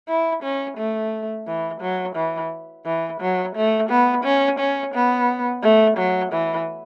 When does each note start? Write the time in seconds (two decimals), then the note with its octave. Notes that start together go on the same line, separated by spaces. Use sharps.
0.08 E4
0.43 C#4
0.77 A3
1.47 E3
1.81 F#3
2.16 E3
2.85 E3
3.21 F#3
3.56 A3
3.90 B3
4.24 C#4
4.59 C#4
4.95 B3
5.63 A3
5.97 F#3
6.33 E3